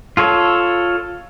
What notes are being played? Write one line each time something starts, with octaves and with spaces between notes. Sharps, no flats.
F4 A4 C#5